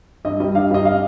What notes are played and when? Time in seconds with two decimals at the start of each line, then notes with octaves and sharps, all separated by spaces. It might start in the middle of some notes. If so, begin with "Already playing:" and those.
0.25 G2 D#5
0.40 G3 D#5
0.55 G2 F5
0.71 G3 D#5
0.85 F5